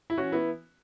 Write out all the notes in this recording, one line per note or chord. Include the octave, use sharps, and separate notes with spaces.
E4
E3 C#4 F#4
B3 E4